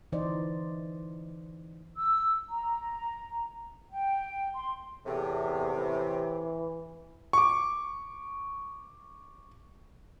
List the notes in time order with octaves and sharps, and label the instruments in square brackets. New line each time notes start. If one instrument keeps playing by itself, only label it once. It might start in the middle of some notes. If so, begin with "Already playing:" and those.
[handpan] D3 E3 D#4 C5 D5 D#5
[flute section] E6
A#5
G5
C6
[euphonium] E2 [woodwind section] A2 C3
[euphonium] E3
[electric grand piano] C#6 D6